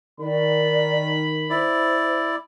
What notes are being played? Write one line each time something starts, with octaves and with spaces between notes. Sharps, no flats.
D#3 D5 B5
E4 C5 D5